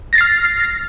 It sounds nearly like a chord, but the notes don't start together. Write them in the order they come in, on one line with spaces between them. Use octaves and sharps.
A#6 A6 C7 F6